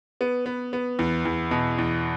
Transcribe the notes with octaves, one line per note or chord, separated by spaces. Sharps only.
B3
B3
B3
E2
E2
B2
E2